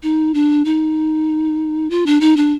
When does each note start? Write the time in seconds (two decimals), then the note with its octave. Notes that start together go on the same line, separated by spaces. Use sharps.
0.03 D#4
0.34 D4
0.65 D#4
1.90 F4
2.06 D4
2.21 D#4
2.37 D4